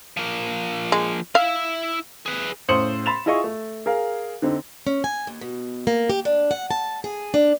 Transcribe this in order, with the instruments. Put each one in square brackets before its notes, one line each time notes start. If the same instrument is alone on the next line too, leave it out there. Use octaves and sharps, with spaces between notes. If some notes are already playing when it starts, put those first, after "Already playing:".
[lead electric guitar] F3 A#3
[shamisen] G#3
[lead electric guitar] E4 E5 [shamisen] F5
[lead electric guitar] G#4 B4
[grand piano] A2 C#3 C5 D#6 C#7 F#7
B5 C6 A6 E7 F7
E4 F4 G#4 D#5 F5 C#6
A3
G#4 A#4 F5
D3 C4 D#4
[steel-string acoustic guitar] C#4
G#5
D#2
B2
A#3
G4
D4
F#5
A5
G#4
D4